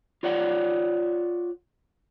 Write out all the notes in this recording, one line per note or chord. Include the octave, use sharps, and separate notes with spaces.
F4 C#5 D5 F#5